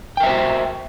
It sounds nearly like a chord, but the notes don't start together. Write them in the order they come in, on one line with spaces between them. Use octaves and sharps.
G5 A#4 E5 C5 F#4